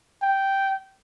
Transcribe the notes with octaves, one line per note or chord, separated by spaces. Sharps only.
G5